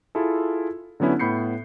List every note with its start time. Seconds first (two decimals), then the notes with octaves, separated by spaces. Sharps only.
0.15 E4 F4 G#4 A4
1.00 D3 F#3 B3 C#4 E4
1.19 A2 B3 B5 G6 C7 C#7